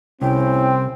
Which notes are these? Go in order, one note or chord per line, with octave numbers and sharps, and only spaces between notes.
C2 A2 C4 C#4 E4 G5